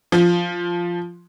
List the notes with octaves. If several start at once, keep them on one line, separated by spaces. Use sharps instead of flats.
F3